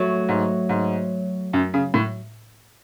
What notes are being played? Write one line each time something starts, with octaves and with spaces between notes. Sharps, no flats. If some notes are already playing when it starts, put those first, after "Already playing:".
Already playing: F#3 A3
G#2
G#2
F#2
C#3
A2